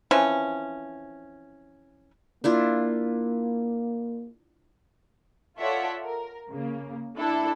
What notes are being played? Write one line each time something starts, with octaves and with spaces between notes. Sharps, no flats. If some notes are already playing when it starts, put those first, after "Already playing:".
E3 F3 C4 C#4
A#3 D4 E4 F4
F4 A4 C#5 D5 E5 F#5
A#4
C#3 A#3
D4 E4 A4 A5